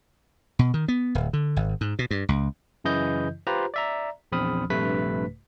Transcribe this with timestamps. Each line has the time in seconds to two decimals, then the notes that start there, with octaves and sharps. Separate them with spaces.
0.59 B2
0.74 D#3
0.88 B3
1.15 D1
1.33 D3
1.56 G#1
1.81 G#2
1.99 B2
2.11 G2
2.29 C#2
2.84 F#2 C#3 E3 E4 D#5 G6
3.47 F4 G4 B4 C5 A#5
3.74 D5 E5 A#5
4.32 A#1 E2 C4 B5 D#6 F6
4.70 A#1 G2 C3 A3 B4 B6